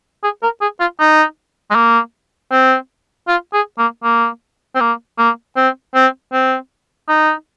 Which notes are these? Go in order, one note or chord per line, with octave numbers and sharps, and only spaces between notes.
G#4
A#4
G#4
F4
D#4
G#3
A#3
C4
F4
G#4
A#3
A#3
C4
A#3
A#3
C4
C4
C4
D#4